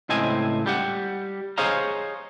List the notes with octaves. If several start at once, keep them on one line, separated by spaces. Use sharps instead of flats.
C#2 A2 C4 D#5 G#5
G3 G4 F#5
G#4 C5 C#5 D#5 F5 A#5